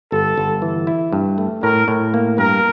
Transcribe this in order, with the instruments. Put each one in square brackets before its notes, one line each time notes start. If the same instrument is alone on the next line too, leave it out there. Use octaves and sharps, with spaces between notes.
[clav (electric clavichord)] G1 [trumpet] A4
[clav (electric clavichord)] G1
E3
E4
G2
A3
[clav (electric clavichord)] A2 [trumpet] A#4
[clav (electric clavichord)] A2
A#3
[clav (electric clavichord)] G2 [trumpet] A#4